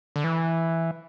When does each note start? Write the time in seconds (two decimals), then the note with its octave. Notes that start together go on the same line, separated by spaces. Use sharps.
0.16 D3
0.24 E3